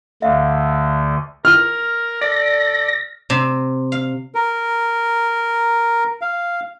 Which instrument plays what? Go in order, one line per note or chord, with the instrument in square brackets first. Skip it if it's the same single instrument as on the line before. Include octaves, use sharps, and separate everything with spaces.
[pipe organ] D2 D3 [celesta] E5 F5
[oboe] A#4 [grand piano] F6
[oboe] A4 [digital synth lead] D5 [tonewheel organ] A#6
[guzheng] C3
F5
[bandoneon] A#4
F5